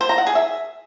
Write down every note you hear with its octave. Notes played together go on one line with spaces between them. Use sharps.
C5
A#5
F#5
G#4
E5